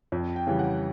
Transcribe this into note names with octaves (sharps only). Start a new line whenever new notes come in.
F2
G5
C#3 E3 G3
F#5